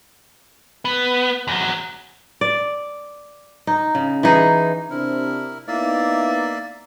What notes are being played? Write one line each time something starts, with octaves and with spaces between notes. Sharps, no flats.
B3
E2 F#3
D5
D#4
C#3
E3 D#4 G#4
C3 C4 D4 E4 A#4
A#3 B3 D#4 E4 D5 E5